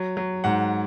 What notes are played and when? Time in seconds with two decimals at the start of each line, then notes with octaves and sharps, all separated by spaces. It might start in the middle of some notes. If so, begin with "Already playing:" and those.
Already playing: F#3
0.17 F#3
0.44 G#2 F#5